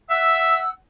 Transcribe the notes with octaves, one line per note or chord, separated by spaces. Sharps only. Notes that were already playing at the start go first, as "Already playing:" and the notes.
E5 F#5 E6